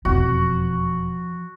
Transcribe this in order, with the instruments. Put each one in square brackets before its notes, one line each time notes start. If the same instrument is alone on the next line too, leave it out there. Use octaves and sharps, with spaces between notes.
[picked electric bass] E1 F2 [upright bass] F3 [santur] F#4